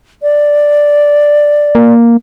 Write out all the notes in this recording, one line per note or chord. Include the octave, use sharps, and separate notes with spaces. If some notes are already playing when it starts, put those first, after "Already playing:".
D5
A#3